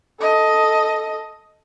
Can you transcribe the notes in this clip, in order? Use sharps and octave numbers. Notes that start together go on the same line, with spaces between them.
A4 D#5